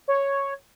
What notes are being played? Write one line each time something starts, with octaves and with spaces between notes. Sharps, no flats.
C#5